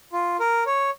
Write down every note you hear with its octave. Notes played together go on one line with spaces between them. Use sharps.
F4
A#4
C#5